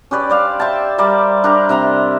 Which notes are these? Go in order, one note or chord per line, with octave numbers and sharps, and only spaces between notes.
C#4 G4 B4 D5
C5 D5 F5
C5 E5 G5 A5
G3 A#4 D5 E5
D4 G4 A#4
C3 E5 A#5 C6